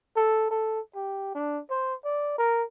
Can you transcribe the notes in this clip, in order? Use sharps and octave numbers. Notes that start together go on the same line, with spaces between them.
A4
A4
G4
D4
C5
D5
A#4